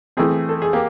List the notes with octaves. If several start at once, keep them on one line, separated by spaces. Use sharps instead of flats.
E3 A3 C4 G#4
A4
G#4
A#3 G4